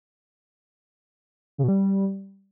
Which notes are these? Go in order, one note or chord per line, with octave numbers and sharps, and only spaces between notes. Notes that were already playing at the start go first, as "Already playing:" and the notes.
C#3
B2
G3